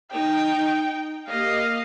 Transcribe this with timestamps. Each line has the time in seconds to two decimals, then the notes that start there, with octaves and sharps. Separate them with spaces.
0.12 D#4 G5
1.28 A#3 G4 D#5 F5